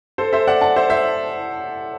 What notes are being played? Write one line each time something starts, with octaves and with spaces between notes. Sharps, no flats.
A4 C5
C5 E5
D5 F#5
F#5 A5
C5 E5
C5 E5